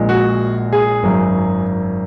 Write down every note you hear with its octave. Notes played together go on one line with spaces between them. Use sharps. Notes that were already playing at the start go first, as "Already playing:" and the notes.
Already playing: A#1 A#2 G#3
F#4
G#4
G#1 F#2 F#3